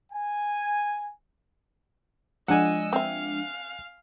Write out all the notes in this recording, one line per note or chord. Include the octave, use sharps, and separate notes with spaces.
G#5
F3 G#3 D4 D#5 F#5 G#5 E6
C4 E5 F5